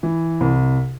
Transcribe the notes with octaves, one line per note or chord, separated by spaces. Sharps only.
E3
C2